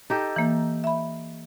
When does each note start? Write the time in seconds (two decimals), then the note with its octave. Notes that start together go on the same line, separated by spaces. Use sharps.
0.10 D#4 G4 A4
0.36 E3 A#3
0.84 E5 B5